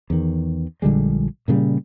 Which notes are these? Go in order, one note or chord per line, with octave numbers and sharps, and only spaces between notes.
E2 D#3
A#1 D3 G3 G#3
A#2 C#3 F#3 G3